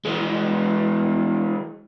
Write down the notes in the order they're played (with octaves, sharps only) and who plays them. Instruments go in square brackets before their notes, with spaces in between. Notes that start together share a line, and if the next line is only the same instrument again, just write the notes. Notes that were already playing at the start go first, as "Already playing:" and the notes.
[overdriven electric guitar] E3 G#3